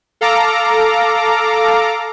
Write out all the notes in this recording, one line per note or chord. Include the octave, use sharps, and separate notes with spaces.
A4 F5 A#5 D6